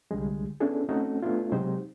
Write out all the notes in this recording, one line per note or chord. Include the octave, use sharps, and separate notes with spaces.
C2 D3 G3 G#3
B3 C#4 D4 E4 G#4 A4
A3 C4 C#4 D#4 F#4 A4
A3 B3 D4 E4 F4
C3 F#3 G#3 D#4 G4 C5